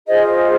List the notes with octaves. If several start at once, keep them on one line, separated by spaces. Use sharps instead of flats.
F4 G#4 C5 D#5